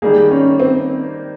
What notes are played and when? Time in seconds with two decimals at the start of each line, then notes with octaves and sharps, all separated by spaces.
0.02 D#3 G3 A#3 G#4
0.31 C#4
0.60 C4